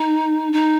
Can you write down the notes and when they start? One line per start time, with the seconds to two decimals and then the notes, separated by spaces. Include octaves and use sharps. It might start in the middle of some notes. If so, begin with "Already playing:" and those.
Already playing: D#4
0.52 D#4